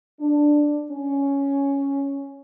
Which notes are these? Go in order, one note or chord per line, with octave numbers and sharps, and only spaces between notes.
D4
C#4